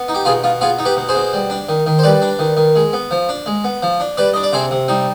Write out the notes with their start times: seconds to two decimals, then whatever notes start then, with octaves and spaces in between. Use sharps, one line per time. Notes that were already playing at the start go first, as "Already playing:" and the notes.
Already playing: B3
0.09 D#4
0.15 G4
0.25 B2 F4 G#4
0.44 B2 F4
0.61 B3 F4 G#4
0.79 D#4
0.85 G4 B4
0.97 B2
1.09 G#4 C5
1.15 B2
1.33 G3
1.50 D4
1.69 D#3
1.86 D#3
1.99 C5
2.03 G3 B4 D5
2.22 D4
2.39 D#3
2.57 D#3
2.75 G#3
2.93 B3
3.11 F3
3.29 D4
3.46 G#3
3.64 B3
3.82 F3
4.00 D4
4.17 G3 B4 D5
4.34 D4 D#5
4.43 D5
4.53 C3 G#4 C5
4.71 C3
4.88 G3 D#4